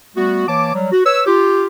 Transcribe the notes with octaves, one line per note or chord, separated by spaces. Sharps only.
G3 A3 B3 F#4
E3 A#3 C#5 A5 D6
F#3 G3
F#4
B4 C#5 E6
F4 G4